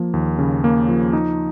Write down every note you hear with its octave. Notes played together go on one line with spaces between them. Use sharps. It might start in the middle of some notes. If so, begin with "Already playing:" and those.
Already playing: F3 A#3
D#2
C#3
A#3
F3
D#4